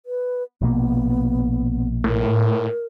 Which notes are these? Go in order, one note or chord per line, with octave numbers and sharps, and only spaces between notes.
B4
A#1 B2 A#3 B3
A2 A#4